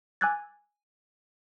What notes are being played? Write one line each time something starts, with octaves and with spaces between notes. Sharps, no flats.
G#5 D6 E6 F#6 G#6 A6